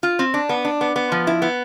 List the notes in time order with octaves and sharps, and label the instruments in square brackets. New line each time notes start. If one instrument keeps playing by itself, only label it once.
[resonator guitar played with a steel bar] F4
C4
D4
B3
D4
B3
B3
F3
E4
B3